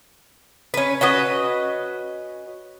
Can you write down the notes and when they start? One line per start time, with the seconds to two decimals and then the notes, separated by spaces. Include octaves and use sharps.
0.74 C#4 B4
1.01 C#4 F#4 B4 D#5